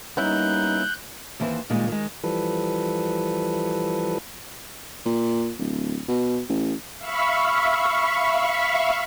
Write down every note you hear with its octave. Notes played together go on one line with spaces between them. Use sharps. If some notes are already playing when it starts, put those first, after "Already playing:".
G3 A#3 B3 C#4 D#4 E4 F#6 G6
D#2 E3 E4 C5
A#2 D#3 G3 G#3
D#3 G#3
E3 F3 G3 A4 B4
A#2
D1
B2
A1
E5 F5 B5 C#6